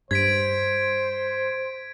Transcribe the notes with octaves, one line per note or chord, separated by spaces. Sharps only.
G2 C5 G#6 B6 D7